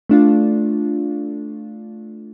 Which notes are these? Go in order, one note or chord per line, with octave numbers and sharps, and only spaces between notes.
A3 D4 F4